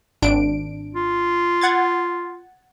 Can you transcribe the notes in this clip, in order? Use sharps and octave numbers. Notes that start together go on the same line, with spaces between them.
G#1 D4 D7
F4
F#5 G#6 A6